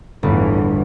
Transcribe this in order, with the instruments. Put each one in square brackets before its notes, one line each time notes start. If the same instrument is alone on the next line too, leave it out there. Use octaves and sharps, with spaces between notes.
[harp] G1 [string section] E2 A2 E3